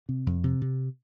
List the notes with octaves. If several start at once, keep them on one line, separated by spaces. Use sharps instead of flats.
C3
F2
C3
C3